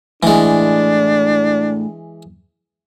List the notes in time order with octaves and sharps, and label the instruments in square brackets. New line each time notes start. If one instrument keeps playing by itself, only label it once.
[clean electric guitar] A2 [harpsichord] E3 G#3 [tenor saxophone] D4